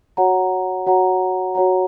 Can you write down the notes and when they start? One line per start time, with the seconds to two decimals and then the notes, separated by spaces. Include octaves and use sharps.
0.17 F#4 C#5 F#5 A#5
0.86 F#4 C#5 F#5 A#5
1.55 F#4 C#5 F#5 A#5